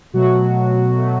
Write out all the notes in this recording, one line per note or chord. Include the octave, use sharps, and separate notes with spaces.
B2 F#3 A3 F#4
B2 F#3 A3